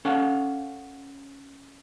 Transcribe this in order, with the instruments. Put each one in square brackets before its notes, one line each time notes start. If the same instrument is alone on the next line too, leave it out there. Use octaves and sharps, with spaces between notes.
[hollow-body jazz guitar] C#4 A4 F5 F#5